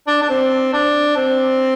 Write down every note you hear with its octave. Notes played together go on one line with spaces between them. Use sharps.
D4
D4
C4
D4
C4